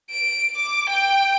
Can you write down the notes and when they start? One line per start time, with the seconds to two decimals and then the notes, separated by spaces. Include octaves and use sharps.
0.11 D7
0.56 D6
0.90 G5